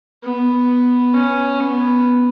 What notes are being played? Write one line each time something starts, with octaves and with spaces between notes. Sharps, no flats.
B3
C#4
B3